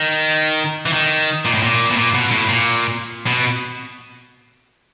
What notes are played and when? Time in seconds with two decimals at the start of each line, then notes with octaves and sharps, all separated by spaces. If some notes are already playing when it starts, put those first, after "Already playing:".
Already playing: D#3
0.86 E3
0.93 D#3
1.45 A#2
1.54 A2
1.63 A#2
1.91 B2
1.97 A#2
2.14 B2
2.31 A2
2.49 A#2
3.27 B2